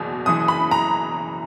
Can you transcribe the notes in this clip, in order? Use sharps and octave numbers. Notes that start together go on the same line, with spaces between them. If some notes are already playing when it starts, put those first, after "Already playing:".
Already playing: F#1 E2 B2
F#1 F#2 E3 D#6
B5
A#5